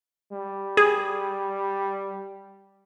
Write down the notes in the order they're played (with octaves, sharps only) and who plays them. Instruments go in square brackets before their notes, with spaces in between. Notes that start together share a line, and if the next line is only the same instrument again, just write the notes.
[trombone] G3
[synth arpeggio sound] G#4